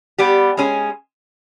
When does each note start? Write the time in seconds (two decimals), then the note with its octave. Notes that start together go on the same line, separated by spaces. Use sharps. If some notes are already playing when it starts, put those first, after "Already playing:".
0.18 G3 B3 G4
0.57 G#3 C#4 G#4